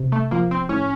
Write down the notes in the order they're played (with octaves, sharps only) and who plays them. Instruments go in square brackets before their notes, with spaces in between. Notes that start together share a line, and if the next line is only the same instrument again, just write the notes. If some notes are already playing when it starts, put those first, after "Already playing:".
Already playing: [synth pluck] C3
[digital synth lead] A3
[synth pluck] F3 [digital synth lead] A#3
[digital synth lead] C4
[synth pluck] A2 [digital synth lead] C#4